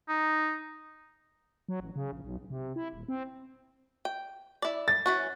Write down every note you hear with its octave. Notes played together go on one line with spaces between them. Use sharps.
D#4
F#3
A1
C#3
A#1
B1
B1
C3
E4
D#1
C4
G5
E4 D5
A6
E3 C#4 F#4